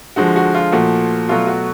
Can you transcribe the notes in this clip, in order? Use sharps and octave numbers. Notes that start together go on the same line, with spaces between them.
D3 F3 G#3 F#4
F#4
F4
A#2 F3 A3 F#4
B2 F#3 A3 F4
F#4